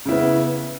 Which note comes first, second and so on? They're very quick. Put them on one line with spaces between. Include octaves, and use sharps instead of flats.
C#3 E4 B3